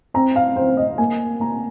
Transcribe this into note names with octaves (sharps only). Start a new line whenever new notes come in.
C4 A#5
F5
C4 C5
D#5
A#3 G#5
A#3 A#5